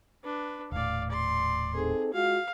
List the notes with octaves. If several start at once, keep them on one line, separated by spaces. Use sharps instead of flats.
D4 B4
D#1 A2 D5 F5
D5 C6
C4 D#4 G#4 A4
G#3 F4 F#4 F5